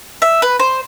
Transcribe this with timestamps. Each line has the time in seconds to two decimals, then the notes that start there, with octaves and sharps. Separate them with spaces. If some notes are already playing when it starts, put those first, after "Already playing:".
0.22 E5
0.42 B4
0.59 C5